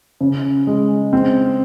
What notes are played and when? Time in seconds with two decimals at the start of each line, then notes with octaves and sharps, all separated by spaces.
0.21 C#3
0.67 G#3
1.13 C4